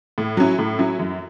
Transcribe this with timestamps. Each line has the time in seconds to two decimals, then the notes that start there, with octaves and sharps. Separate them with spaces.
0.18 A2
0.37 F#3 C#4 E4
0.59 A2
0.79 F#3 C#4 E4
0.99 F#2